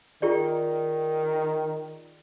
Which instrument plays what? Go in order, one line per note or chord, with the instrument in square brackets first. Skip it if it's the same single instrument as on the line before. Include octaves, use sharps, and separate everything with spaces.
[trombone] D#3 [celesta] F4 G#4 D5